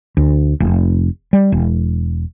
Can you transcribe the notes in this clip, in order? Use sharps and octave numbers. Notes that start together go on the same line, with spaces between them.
D2
F1
G3
E1